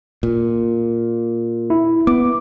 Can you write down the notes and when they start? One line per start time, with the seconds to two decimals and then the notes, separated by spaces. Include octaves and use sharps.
0.23 A#2
1.70 E4
2.07 B3 D6